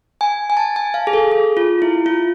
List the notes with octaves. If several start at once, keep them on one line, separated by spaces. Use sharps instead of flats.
G#5
G#5
A5
G#5
F5
G#4
A4
G#4
F4
E4
F4